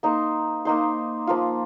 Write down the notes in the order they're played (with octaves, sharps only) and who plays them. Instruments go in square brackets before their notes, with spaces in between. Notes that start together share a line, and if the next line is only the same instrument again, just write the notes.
[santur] A#3 D#4 C5
A#3 D#4 C5
F3 A#3 F4